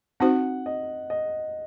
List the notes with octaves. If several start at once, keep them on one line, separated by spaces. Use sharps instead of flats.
C4 D#4 F#4 C5 F#5
D#5
D#5